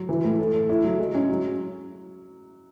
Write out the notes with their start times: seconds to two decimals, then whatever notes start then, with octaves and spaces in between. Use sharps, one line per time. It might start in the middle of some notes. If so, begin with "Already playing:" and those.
Already playing: F#3
0.09 E3
0.24 A2
0.39 A4
0.54 A4
0.69 E4
0.84 F#3
0.99 G#3
1.14 C#4
1.29 F#3